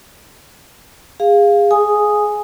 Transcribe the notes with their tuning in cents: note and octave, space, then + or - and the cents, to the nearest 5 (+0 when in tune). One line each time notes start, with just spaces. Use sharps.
G#4 -25 F5 +0
G#4 +15 G#5 +0 D#6 +0